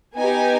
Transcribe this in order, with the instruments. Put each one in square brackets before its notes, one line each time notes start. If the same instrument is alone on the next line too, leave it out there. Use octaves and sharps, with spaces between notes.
[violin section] B3 D#4 G4 G#5